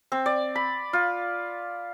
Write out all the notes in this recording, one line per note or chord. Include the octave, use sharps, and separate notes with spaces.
C4
D5
B5
F4